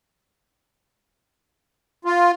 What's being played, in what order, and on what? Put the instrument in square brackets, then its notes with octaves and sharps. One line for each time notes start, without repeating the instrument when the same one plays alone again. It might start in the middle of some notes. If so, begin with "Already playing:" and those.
[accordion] F4